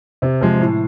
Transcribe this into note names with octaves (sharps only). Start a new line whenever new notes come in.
C3
F3 G#3
A2